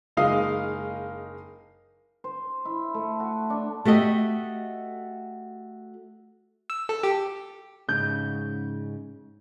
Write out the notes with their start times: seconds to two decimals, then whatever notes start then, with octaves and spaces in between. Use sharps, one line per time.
0.17 F#1 G#3 D#4 F5 D#6
2.24 C5
2.65 E4
2.94 A3
3.20 F#4
3.50 D4
3.85 A3 F#4 G4 D#5 E5
6.70 E6
6.89 A4
7.03 G4
7.89 G#2 C#3 G6